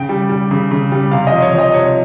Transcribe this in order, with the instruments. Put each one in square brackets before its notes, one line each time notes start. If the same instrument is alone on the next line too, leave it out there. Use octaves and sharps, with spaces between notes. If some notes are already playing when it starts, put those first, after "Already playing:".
Already playing: [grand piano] C#3 G5
G3
G3
C#3
C#3
G3
C3 F5
F3 D#5
C#5
F3
D#5
C3 C#5